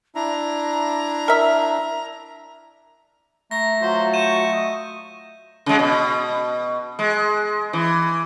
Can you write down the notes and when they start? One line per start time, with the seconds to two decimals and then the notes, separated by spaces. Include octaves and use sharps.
0.15 D4 E4 A#5
1.28 A#4 E5
3.51 A3 A#5 A#6
3.82 F#3 F4 F#4 C5
4.14 C#6 G6 D#7 E7
4.53 D#5
5.66 C#3 G#3
5.79 B2
6.99 G#3
7.73 E3